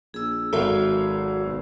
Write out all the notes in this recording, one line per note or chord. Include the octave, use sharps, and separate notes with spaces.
A#1 G#4 E6
G#1 F#3 F#4 A4 A#4 E5 F5
B1